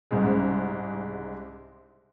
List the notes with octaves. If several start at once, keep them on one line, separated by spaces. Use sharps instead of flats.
C2 G#2 C#3 G#3